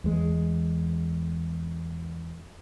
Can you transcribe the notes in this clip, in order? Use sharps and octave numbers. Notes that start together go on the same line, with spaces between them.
E2 G#3